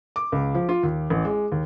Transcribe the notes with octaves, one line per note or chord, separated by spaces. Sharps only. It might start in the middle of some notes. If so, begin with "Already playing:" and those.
D6
C#2
F3
F4
D#2
A1
G#3
D#2